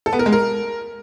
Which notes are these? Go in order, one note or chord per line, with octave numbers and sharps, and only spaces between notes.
A4
B3
A#4
G#3
A#4